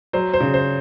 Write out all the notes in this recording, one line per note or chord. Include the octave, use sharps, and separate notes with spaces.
F#3 C5
C5
C#3
C5